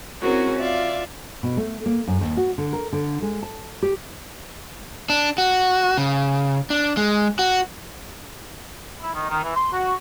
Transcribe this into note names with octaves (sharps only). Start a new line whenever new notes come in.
C4 C#4 E4 F#4 G#4 A#4
F4 D5 E5 F5
B2
A3
A#3
F#2
D#2
F#4
D3
A#4
D3
G#3
A5
G4
D4
F#4
C#3
D4
G#3
F#4
E4
D#3
D#3
E3
C6
F#4